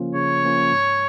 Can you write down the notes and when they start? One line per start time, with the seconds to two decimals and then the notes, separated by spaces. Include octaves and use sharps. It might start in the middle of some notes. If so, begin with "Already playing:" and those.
Already playing: C#3 F3 A#3 C#4 F4
0.15 C#3 C#5
0.44 F3 A#3 C#4 F4
0.72 G#2